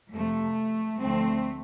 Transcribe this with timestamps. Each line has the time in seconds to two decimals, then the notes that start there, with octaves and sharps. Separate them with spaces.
0.12 F2 C3 F3 A3
1.00 D2 D3 F3 A3 C4